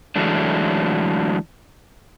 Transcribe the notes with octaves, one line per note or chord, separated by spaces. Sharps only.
D3 E3 F#3 G#3 A3 D4